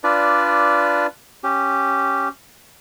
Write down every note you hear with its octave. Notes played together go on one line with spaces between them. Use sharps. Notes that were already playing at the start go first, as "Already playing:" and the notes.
D4 F4 B4 D5
C#4 G4